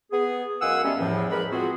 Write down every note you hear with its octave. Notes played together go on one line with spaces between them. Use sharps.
B3 G#4
F#2 G#3 F5 F#5 G#5 E6
G3 A3 B3 C#4
E2 A2 F3
G#3 A#4 B4 B5
G#3 B3 C4 F4 F#4 G#4